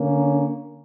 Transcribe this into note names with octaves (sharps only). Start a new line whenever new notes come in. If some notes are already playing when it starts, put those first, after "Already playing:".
Already playing: D3 A#3 C#4